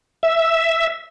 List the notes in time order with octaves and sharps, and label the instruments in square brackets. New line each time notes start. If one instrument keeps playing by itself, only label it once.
[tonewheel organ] E5